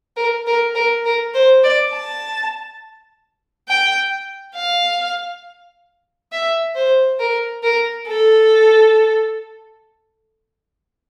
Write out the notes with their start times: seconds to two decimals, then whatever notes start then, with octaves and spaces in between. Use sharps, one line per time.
0.16 A#4
0.47 A#4
0.75 A#4
1.05 A#4
1.34 C5
1.64 D5
1.92 A5
3.68 G5
4.55 F5
6.32 E5
6.75 C5
7.19 A#4
7.63 A#4
8.07 A4